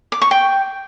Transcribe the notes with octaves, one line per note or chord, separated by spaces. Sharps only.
D6
C#6
G5